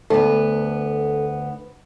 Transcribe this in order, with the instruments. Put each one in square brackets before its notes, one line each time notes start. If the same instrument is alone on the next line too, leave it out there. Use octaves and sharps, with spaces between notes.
[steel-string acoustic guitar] D2 B3 [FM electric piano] A4